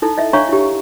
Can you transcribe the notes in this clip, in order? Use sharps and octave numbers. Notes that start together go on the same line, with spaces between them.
D#4 E4 A4
D#5 E5
D4 C#5 E5 F5 A#5 C#6
E4 G4